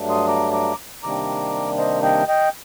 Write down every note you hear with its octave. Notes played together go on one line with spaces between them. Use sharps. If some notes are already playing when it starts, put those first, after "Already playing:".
Already playing: G2 F#3 A3 D4
C6 D#6
A#5 D6
A#5 D6
C3 D#3 G3 A#3 D4 A#5 D6
C5 D#5
D#5 G5
D#5 G5